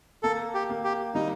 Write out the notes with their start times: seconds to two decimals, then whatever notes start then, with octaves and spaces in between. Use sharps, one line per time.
0.23 A#3 A4
0.54 G4
0.70 A#3
0.84 G4
1.15 G3 D#4